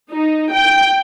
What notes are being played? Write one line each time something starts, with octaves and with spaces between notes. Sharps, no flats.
D#4
G5